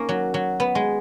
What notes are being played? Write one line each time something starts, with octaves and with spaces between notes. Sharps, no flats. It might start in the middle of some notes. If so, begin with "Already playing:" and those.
Already playing: A#3 C#4 D#4
F#3
F#3
B3
G#3